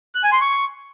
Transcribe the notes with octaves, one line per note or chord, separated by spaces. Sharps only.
F#6
G#5
C6
C#6